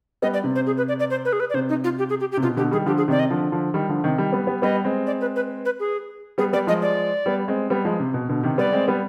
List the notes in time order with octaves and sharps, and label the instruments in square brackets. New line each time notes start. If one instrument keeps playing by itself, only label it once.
[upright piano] G3 B3 [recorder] D#5
[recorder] D5
[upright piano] C3
[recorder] C5
G#4
B4
D5
D5
C5
B4
G#4
B4
D5
[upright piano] C3 [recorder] C5
[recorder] D#4
F4
G4
G#4
G4
G4
[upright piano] C3
[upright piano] B2 [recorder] F4
[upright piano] B2 D3 [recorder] G4
[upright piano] D#3 G3 [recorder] G#4
[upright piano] D3 F3 [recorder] G4
[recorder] G#4
[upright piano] C3 D#3 [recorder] D5
[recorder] D#5
[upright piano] D3 F3
D3 F3
D#3 G3
D3 F3
C3 D#3
D#3 G3
G3 B3
G3 B3
[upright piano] G3 B3 [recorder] D#5
[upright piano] G#3 C4
[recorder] D5
B4
B4
B4
G#4
[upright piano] G3 B3 [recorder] G#4
[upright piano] G3 B3 [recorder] D5
[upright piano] F3 G#3 [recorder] D#5
[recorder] D5
[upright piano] G3 B3
G#3 C4
G3 B3
F3 G#3
C3
B2
B2 D3
C3 D#3
[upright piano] G3 B3 [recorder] D5
[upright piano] G#3 C4
G3 B3